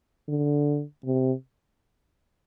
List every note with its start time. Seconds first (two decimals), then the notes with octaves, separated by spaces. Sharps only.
0.29 D3
1.05 C3